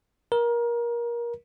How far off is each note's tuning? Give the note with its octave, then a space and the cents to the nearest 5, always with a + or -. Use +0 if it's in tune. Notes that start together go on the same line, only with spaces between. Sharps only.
A#4 +25